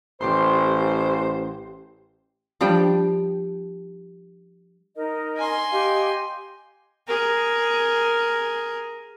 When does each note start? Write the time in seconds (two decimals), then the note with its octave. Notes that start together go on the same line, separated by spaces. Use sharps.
0.21 A1 G4 C5 C6
2.61 F3 G3 D4 G5
4.95 D#4 A#4 D#5
5.37 G#5 C6
5.72 G4 D#5 F5
7.07 G#4 A#4